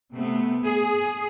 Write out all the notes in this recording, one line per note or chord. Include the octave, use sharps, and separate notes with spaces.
C3 A3 B3
G#4